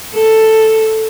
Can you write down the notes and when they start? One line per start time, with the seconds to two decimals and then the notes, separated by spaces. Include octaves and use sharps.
0.14 A4